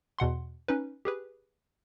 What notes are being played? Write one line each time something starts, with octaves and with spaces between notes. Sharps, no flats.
E2 B2 F#5 C6
C#4 D#4 B4
G4 G#4 B4